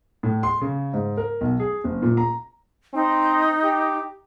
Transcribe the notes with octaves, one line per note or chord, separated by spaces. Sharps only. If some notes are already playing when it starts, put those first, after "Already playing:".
A2
C6
C#3
G#2
A#4
B1
G#4
F#1
A#2
A#5
C4 D#4
G4